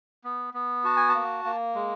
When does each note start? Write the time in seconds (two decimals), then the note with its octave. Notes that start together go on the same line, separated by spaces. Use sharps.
0.24 B3
0.54 B3
0.84 F#4 A5
0.97 G#5
1.09 A5
1.15 A#3
1.45 A#3
1.75 G#3